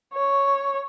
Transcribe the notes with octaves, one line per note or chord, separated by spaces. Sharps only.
C#5